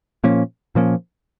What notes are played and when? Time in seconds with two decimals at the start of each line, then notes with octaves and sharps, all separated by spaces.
0.24 A#2 F3 A#3 C#4
0.75 A#2 F3 A#3 C#4